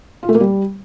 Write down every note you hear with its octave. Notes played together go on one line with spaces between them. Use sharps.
F4
A3
A#3
G3